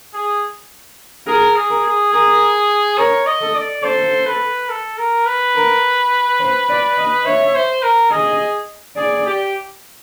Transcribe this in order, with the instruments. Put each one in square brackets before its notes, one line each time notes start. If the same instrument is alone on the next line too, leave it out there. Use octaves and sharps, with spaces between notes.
[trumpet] G#4
[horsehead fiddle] G#4 [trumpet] A#4
[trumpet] G#4
[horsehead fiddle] A#4
[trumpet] G#4
[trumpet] G#4 [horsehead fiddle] A#4
[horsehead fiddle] A#4 [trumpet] C#5
[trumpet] D#5
[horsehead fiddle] A4
[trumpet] D5
[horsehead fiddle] A4 [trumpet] C5
[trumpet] B4
A4
A#4
B4
[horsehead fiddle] A#4
C5
D5
D#5
[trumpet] C#5 [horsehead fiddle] E5
[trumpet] C5
A#4
[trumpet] G#4 [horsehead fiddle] D#5
[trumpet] G#4 [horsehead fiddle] D5
[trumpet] G4